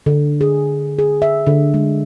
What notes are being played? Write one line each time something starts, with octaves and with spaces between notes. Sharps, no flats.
D3
G#4
G#4
E5
D3
G#3